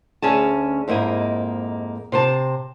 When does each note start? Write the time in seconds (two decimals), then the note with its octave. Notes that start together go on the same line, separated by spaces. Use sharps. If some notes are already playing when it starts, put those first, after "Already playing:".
0.22 D2 C#4 G#4 A5
0.88 F2 G#2 A#3 E4 D#5
2.12 C3 C5 A5